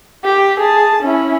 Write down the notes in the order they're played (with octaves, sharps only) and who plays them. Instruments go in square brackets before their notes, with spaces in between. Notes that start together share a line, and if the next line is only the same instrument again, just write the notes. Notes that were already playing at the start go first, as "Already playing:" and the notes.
[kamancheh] G4
G#4 A5
C#4 E4